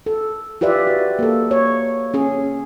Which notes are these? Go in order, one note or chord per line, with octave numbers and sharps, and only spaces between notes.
A4
F4 G4 B4 D5 E5
F#4
A#3 A4
C#5
C#4 G#4